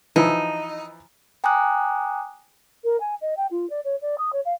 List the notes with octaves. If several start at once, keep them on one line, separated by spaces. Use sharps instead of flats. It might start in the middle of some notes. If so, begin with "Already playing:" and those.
E3 F3 D#4 E4
G5 G#5 A#5 D6 D#6 F#6
A#4
G#5
D#5
G5
F4
D5
C#5
D5
D#6
C#5
F5